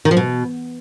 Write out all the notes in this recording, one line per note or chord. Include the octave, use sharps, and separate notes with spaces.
D#3
F3
B2